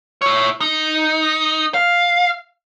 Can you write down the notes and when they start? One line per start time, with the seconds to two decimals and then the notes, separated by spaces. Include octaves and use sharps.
0.22 E4 C#5
0.61 D#4
1.74 F5